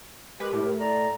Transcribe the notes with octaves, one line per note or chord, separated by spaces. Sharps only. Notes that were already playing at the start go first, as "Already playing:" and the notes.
G#3 G4 A#4 B4
A2 G4
D5 A#5